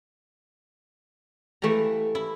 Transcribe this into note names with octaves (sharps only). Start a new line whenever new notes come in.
E3 A3 G4 F5 A#5
E4